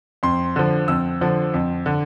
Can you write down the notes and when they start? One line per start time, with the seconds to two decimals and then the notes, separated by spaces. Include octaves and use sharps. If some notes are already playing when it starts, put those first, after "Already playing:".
0.23 F2 C6
0.56 D3 F3
0.88 F2 E6
1.21 D3 F3
1.54 F2
1.86 D3